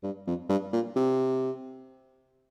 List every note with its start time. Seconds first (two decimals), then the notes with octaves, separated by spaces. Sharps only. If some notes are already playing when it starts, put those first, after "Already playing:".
0.04 G2
0.27 F2
0.49 G2
0.73 A#2
0.96 C3